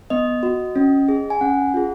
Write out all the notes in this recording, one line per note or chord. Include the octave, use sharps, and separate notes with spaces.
B3 D#5
F#4
C#4
G#4
G#5
C#4 F#5
F4 G#4